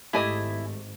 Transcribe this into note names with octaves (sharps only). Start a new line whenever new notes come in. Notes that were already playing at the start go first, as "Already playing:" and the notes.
G#1 G#2 A3 E4 G4 D#5 G#5 D#6